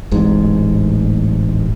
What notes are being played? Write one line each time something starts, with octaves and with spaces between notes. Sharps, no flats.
D1 A1 G#2